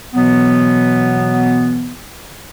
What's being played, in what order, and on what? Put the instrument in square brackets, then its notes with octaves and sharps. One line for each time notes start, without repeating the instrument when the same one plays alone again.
[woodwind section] B2 E3 F#3 B3